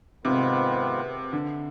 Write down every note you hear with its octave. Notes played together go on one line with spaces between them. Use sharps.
G#2 C3 D#3 B3 F4 B4
D3